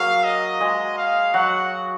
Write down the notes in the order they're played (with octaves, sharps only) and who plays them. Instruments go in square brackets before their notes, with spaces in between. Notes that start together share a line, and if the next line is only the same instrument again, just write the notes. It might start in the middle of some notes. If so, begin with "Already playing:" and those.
Already playing: [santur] F#3 A#3 F#4 G#4 A#4 [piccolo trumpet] F5
[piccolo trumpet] D#5
[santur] G#3 G#4
[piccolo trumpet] F5
[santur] F#3 F#4 [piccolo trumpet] F#5